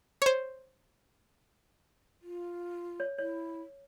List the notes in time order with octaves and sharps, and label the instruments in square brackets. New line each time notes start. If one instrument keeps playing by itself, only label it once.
[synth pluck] C5 C#5
[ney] F4
[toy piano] C#5
[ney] E4 [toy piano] C#5